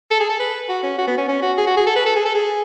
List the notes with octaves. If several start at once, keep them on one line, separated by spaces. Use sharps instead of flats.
A4
G#4
A4
B4
F#4
C#4
F#4
B3
C#4
C#4
F#4
G#4
F#4
G#4
A4
B4
A4
G#4
A4
G#4